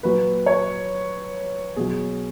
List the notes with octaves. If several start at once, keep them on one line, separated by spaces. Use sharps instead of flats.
A#2 F#3 B4
C#5
B2 F#3 G#4